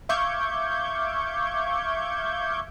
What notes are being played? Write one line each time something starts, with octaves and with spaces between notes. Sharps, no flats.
E5 F5 C#6 D6 G6 G#6